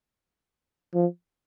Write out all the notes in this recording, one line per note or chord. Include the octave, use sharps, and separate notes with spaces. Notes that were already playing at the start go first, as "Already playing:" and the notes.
F3